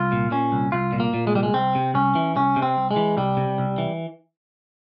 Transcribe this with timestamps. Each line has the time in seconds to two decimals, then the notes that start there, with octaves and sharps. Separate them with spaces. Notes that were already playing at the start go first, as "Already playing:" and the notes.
Already playing: C2 F4
0.12 A#2
0.31 A#2 C#4
0.52 C2
0.72 C2 F4
0.93 A#2
1.00 A#3
1.14 A#2
1.27 G#3
1.34 C2 G3
1.43 G#3
1.54 C2 C4
1.75 C3
1.94 C2 C#4
2.15 E3
2.36 C2 C#4
2.56 C3
2.62 C4
2.77 C2
2.91 G#3
2.96 E3
3.17 C2 G3
3.37 C3
3.58 C2
3.78 E3